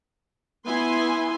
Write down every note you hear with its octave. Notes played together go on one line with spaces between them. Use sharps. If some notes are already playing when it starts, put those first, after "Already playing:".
B3 E4 G#5 C6